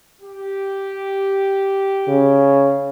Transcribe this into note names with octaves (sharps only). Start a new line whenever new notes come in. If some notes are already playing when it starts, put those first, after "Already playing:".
G4
C#3